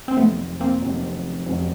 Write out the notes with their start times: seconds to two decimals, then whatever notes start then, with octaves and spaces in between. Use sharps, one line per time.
0.08 C4
0.17 F1 F2 C3 D#3 F#3 A3 B3
0.61 A#3 C4
0.82 F1 F2 C3 D#3 F#3
1.46 F1 F2 C3 D#3 F#3